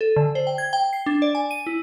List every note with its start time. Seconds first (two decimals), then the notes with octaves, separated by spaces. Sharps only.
0.01 A4
0.16 D3
0.35 C5
0.47 G5
0.58 G#6
0.73 G5
0.93 C7
1.06 D4
1.22 D5
1.35 G#5
1.51 D#7
1.67 E4